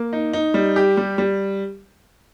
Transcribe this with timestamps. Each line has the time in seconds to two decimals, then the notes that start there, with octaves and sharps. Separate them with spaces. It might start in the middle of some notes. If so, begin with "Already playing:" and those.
Already playing: A#3
0.13 D#4
0.33 D#4
0.54 G3
0.76 G4
0.97 G3
1.18 G3